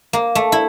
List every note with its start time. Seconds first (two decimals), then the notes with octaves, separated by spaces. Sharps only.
0.13 A#3
0.35 A3
0.52 E4